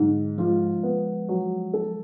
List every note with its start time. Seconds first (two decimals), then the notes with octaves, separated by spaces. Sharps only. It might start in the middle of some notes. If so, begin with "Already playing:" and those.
Already playing: G#2 D3 F#3
0.38 F3 G#3 F4
0.83 B3
1.29 F#3
1.74 A4